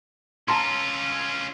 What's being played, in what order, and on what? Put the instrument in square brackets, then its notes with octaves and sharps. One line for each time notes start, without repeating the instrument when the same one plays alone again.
[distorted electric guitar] C#4 F4 [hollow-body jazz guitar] A5 A#5 C6